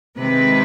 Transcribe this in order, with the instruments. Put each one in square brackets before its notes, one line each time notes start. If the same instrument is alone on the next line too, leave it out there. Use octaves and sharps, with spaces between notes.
[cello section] C3 D#3 G#3 C4 B4